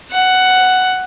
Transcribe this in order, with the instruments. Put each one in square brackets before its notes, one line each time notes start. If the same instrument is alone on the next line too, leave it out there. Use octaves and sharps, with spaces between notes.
[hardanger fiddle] F#5